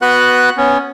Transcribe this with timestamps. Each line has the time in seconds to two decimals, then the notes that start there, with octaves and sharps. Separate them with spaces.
0.02 B3 F#4 B4 F#5 F#6
0.57 B3 C#4